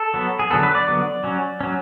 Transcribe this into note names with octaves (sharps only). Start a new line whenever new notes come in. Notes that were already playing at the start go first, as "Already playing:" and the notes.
Already playing: A4
F#3 B3
G#4
D3 F#3 B3 A4
B4
D5
D3 F#3 B3
F#3 C#4
F#3 C#4